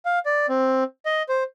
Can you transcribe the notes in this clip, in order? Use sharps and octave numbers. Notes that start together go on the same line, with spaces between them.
F5
D5
C4
D#5
C5